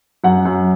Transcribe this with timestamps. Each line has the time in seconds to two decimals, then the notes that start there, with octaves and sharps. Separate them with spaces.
0.24 F#2 F#5
0.45 F#2